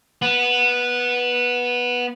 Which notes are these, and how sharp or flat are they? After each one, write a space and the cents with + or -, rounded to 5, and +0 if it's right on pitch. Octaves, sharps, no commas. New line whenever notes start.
B3 -10